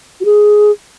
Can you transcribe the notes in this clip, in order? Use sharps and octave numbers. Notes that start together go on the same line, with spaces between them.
F#4
G#4